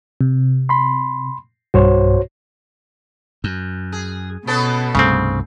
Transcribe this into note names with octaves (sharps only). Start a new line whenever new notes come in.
C3
B5 C6
B1 G2 F#4 C5 C#5
F#2
G#4
B2 B3 C#4 A4
C2 G2 C#3 A3 C4